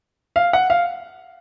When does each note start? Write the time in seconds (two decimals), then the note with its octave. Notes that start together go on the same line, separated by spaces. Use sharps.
0.36 F5
0.53 F#5
0.70 F5